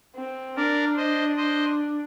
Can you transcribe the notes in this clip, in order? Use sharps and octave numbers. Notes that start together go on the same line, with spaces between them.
C4
D4 A#4 D5
C5 D#5
C5 D#5